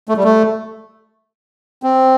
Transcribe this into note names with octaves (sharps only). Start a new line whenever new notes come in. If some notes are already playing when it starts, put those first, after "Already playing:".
A3
G3
A3
C4